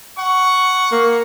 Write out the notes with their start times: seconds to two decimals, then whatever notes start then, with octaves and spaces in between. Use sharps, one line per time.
0.18 F#5 C#6
0.92 A#3